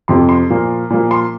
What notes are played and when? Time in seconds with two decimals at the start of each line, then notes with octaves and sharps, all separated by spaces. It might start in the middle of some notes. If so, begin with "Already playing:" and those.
0.08 F2 C3 F3 C6
0.29 C6
0.50 A#2 F3 A#3
0.90 A#2 F3 A#3
1.11 C6